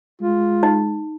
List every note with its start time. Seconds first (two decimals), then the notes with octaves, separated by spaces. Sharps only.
0.22 G#3 F4
0.63 D#4